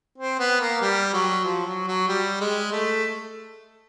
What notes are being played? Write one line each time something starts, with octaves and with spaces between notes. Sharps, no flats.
C4
B3
A#3
G3
F#3
F3
F#3
F#3
G3
G#3
A3